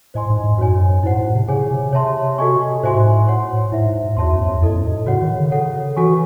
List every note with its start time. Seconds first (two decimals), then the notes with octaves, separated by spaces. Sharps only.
0.14 A2 C5 D#5 G#5 C6
0.30 G#2
0.44 G#2
0.58 F#2 F#4 C#5 G#5
1.03 G#2 E4 C5 F#5
1.18 A2
1.34 C3
1.48 C#3 G#4 C#5 G#5
1.71 C3
1.89 C#3
1.93 C3 C#5 E5 A5 C6
2.38 F#4 A4 D#5 G#5 C#6
2.83 A2 F#4 C5 E5 G#5 C6
2.95 G#2
3.08 A2
3.27 C#5 F#5 C6
3.72 G#2 E4 C5 E5
4.17 E2 F#4 C#5 E5 A5 C6
4.33 F#2
4.47 E2
4.62 F#2 E4 A4 D#5
4.77 G#2
4.92 A2
5.06 C#3 F#4 C#5 F#5
5.22 D#3
5.37 C#3
5.51 A4 C#5 F#5
5.97 E3 F#4 A4 C#5 G#5 C#6